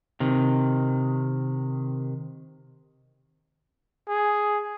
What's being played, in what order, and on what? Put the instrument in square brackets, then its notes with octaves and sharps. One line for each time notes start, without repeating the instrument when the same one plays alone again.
[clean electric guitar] C3 D#3
[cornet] G#4